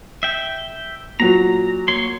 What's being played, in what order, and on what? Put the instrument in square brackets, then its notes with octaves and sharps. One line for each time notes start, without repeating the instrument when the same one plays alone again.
[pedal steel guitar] E5 G5
[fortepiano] A#2 F#3 [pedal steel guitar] A#5
[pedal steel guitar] A#3 C#5 C6